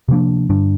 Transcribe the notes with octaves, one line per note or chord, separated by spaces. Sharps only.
C3 F3 A#3 D4
G2 D3 G3 D4